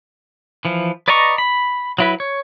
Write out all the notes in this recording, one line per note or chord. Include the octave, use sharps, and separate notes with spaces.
E3 F3
B4 D5 D#5 A#5 C#6
B5
F#3 E4 B4
C#5